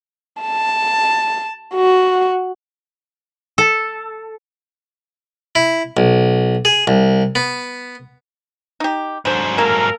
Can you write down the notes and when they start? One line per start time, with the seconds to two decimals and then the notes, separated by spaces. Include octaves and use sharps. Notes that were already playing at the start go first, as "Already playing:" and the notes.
0.42 A5
1.75 F#4
3.58 A4
5.55 E4
5.97 B1
6.65 G#4
6.87 C2
7.35 B3
8.80 D#4 G4
9.25 G#2 D3 F#3 C5
9.58 A#3 A4 A#4